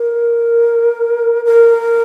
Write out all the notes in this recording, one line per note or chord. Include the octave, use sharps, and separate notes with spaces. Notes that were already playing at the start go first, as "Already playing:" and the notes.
Already playing: A#4
A#4